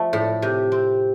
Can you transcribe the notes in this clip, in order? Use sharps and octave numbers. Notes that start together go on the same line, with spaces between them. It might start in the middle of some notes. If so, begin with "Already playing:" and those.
Already playing: F3 A3
A2
C3
C4